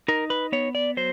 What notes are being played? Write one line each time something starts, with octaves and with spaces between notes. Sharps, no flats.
D#4 A#4
B4
B3 C#5
D5
F#3 C5